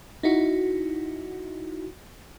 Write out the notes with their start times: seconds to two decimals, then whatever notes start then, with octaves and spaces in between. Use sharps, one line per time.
0.23 D#4 E4 F#4